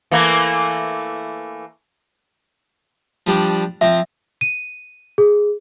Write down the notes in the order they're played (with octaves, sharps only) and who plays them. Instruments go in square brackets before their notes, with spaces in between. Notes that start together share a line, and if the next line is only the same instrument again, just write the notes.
[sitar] E3 A3 A#3
[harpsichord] F3 G3 D4
[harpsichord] F3 C4 [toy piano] E5
[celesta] D#7
G#4